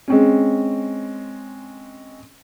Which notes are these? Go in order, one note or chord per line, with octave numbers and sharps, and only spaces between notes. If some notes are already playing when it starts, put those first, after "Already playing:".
G#3 C4 C#4